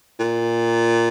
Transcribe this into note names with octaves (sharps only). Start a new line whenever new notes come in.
A#2